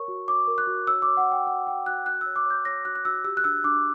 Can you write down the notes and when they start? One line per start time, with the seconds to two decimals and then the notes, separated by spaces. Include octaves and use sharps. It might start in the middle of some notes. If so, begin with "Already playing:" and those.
Already playing: A#4 C#5 C#6
0.08 F#4
0.28 C#5 D6
0.47 A#4
0.58 F#6
0.67 F#4
0.87 C#5 E6
1.02 D6
1.07 C#5
1.17 F#5
1.27 C#5 G5
1.47 F#4 F#5
1.67 F#4 G5
1.86 F#4 F#6
2.06 F#4 F#6
2.21 E6
2.26 C#5
2.36 D6
2.46 C#5 G6
2.65 C#5 A#6
2.85 F#4 F#6
2.95 F#6
3.05 F#4 E6
3.24 G4 E6
3.37 F#6
3.44 D4 E6
3.64 D4 D6